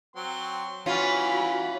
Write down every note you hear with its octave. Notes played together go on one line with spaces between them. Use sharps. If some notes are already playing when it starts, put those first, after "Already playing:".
F#3 C4 C6
E3 C#4 F4 F#4 B5